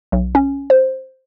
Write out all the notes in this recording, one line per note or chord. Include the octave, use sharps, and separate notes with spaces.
B1
C#4
C5